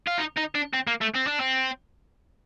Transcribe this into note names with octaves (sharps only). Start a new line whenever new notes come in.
F4
D#4
D#4
D4
C4
A#3
A3
C4
D4
C4